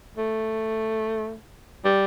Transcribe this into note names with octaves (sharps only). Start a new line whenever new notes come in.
A3
G3